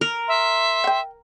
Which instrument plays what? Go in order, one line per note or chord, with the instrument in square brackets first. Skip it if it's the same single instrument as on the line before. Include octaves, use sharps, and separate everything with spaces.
[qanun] A#4
[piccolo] E5 [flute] C6
[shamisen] F#5 G5